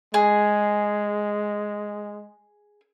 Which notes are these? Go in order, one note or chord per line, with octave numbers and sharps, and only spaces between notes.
G#3 G#4